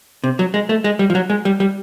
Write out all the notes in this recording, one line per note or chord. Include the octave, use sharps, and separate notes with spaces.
C3
F#3
G#3
A3
G#3
G3
F3
F#3
G#3
G3
G3